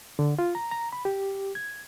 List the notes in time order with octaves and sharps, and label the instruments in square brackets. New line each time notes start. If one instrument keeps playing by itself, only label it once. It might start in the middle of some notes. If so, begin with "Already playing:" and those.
[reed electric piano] D3
F4
A#5
A#5
B5
G4
G#6